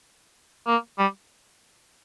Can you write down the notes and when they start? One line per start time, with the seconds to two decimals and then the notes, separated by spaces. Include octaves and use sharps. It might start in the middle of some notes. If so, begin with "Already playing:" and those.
0.67 A#3
0.99 G3